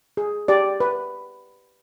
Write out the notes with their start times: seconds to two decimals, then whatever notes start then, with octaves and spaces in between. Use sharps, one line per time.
0.17 G#4
0.48 G4 D5
0.80 B4